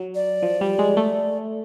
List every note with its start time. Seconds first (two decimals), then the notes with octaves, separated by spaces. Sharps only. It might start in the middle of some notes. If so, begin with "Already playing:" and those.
Already playing: F#3
0.15 D5
0.43 F3
0.61 G3
0.79 G#3
0.97 A3